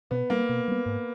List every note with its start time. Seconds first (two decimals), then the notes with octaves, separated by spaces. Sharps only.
0.11 B2 B3
0.30 G3 A#3 B3
0.49 B2
0.68 G3 B3
0.86 G#2